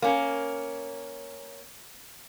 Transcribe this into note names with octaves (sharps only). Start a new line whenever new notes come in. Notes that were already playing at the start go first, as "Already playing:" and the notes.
A#3 C#4